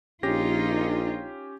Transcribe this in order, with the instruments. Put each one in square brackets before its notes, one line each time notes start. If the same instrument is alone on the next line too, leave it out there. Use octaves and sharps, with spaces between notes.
[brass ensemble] A#1 [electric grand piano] C#4 G4 A#6 [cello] D#4 F4